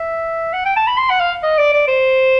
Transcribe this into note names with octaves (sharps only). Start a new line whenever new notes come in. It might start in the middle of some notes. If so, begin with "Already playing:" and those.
Already playing: E5
F#5
G5
A5
B5
C6
F#5
F5
D#5
D5
D5
C5